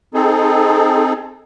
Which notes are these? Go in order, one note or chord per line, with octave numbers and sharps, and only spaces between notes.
C4 D#4 G#4 A4